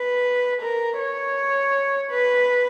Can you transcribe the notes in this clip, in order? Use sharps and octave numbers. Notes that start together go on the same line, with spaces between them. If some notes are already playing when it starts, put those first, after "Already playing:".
Already playing: B4
A#4
C#5
B4